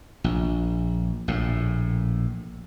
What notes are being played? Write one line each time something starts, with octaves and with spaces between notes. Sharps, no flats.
A#1
A#1 A2